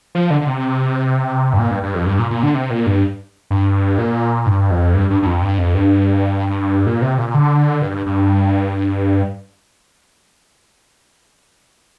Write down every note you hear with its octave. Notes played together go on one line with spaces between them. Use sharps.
F3
D3
D3
C3
G2
A#2
G2
G2
F2
G2
A#2
A#2
D3
C3
A#2
G2
G2
A#2
G2
F2
G2
G2
G2
F2
G2
F2
G2
A#2
C3
A#2
D3
G2
G2